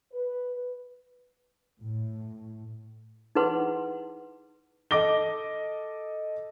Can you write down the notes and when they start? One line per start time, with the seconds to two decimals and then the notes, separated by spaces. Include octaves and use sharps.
0.12 B4
1.79 A2
3.35 D#4 E4 G#4 B4 F#5 C6
4.91 A4 D#5 D6 A#6 G7